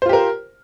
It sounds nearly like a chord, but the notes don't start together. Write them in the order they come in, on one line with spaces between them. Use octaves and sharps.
C5 F4 G4 A#4